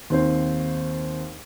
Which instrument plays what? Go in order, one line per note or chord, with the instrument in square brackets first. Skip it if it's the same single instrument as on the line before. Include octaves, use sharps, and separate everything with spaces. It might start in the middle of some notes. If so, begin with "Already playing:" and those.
[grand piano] D#2 C4 C5